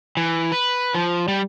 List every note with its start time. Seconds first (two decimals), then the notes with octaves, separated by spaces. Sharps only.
0.17 E3
0.52 B4
0.95 F3
1.28 G3